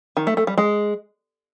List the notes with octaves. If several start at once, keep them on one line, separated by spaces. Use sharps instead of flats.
D#3
A3
A3
G3
G#3